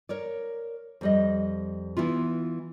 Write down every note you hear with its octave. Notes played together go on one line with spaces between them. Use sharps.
A#4 C#5 D5
F2 G3 D#5
E3 B3 E4 F4